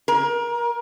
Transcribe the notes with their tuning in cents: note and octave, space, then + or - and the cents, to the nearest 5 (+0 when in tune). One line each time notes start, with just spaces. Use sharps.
A#4 +30